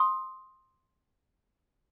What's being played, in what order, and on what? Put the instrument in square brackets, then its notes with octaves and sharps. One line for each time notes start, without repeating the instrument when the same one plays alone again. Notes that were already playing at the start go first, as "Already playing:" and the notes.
Already playing: [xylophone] C6 D#6